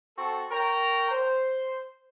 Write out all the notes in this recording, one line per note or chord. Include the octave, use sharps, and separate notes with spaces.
C4 F#4 A4
A#4 C#5 G5 A#5
C5